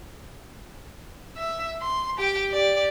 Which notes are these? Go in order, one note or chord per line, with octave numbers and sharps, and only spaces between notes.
E5
C6
G4 G5
G4 D5